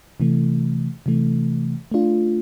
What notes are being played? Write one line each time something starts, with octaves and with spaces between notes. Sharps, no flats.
C3 E3 A3
C3 E3 A3
A3 D4 F4